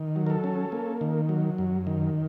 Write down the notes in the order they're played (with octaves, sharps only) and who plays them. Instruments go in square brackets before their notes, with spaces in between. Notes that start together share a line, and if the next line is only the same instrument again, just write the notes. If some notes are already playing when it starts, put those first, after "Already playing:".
Already playing: [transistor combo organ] D#3
F#3
A#4
A4
C#4
A#3
D#3
F#3
F#2
D#3